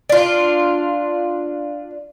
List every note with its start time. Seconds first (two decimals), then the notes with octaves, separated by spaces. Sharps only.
0.10 D4 F4